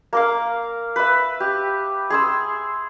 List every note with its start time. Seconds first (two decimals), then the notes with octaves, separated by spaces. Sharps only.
0.13 A#3 A#4 F5
0.96 B4 E5
1.40 G4
2.10 G#4 C6 E6